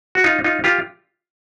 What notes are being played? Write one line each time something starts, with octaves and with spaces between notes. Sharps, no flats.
F#4
D#4 F4
D#4 F4
F4 G4